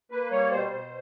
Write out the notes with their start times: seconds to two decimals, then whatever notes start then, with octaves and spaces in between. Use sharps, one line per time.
0.11 A#3 B4
0.31 G3 C#5
0.51 B2 C5
0.71 B2